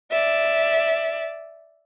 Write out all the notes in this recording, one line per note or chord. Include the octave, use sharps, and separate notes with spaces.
D5 E5